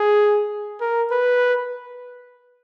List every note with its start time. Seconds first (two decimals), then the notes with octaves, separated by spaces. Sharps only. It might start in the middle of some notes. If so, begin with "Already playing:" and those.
Already playing: G#4
0.81 A#4
1.11 B4